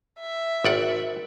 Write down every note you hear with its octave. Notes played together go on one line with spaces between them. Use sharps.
E5
G#1 D5 F#5